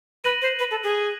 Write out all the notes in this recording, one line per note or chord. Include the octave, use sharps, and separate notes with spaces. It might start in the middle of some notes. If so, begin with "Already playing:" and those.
B4 F#6 A#6 D#7 F#7
C5
B4
A4
G#4